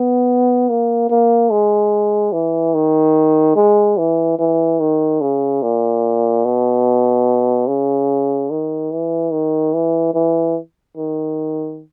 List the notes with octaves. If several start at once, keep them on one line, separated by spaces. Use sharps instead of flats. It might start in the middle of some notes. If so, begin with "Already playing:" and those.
Already playing: B3
A#3
A#3
G#3
E3
D#3
G#3
E3
E3
D#3
C#3
A#2
B2
C#3
D#3
E3
D#3
E3
E3
D#3